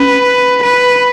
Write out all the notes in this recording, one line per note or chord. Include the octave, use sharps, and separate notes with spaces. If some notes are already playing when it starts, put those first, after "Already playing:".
Already playing: C#4 B4
B4